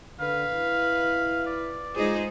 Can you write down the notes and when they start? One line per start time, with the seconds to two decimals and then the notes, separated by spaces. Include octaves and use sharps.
0.20 D3 B4 F5
0.53 E4
1.46 D5
1.96 G#3 D#4 F4 G#4 C5